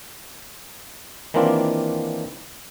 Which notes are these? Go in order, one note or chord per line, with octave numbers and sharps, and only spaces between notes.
D#3 E3 A#3 C4 D4 F4